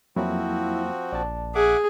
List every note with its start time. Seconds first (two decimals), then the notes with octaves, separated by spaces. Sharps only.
0.16 F2 F3 F#3 A#3 C4 E4 F#4
1.12 A#1 D5 A5
1.55 G#4 E5 F#5 D6